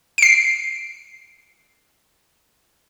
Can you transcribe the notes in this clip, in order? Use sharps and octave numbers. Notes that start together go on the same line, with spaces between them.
C7 D7